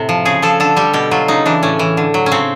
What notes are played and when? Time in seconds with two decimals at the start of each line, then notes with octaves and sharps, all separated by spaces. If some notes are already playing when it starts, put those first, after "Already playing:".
Already playing: A2 C3
0.09 F3
0.25 C#3 G#4
0.42 F3 A4
0.60 D3 A4
0.76 G3 G4
0.93 B2 G4
1.11 F#3 F4
1.28 C#3 D#4
1.46 E3 D4
1.63 A2 C#4
1.79 E3
1.97 D3
2.14 F#3
2.26 C#4
2.31 C#3 C4